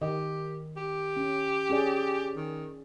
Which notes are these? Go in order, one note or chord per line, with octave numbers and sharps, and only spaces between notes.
D#3 G4 D#5
G4
C#4
C#4 G#4 D5
D#3